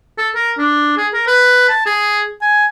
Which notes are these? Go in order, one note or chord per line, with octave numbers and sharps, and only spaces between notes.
A4
A#4
D4
G#4
A#4
B4
A5
G#4
G#5